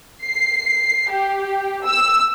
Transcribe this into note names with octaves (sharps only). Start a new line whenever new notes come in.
C7
G4
E6